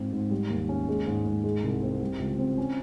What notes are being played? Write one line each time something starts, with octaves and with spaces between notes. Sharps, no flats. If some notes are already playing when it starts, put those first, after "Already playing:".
Already playing: G#2 C4 F4
G#2
G3
D#2
C#4
G#3
G#2
G#2
G#3
C2
C4
G3
C#2
C4
C#4